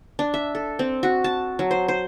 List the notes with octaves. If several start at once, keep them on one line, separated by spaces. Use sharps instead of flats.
D4
E5
A4
C4
F#4
A5
F#3
C5
C5